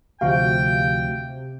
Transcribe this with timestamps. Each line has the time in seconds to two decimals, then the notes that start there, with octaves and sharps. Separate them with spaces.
0.21 D2 C3 F3 F#4 F5 G5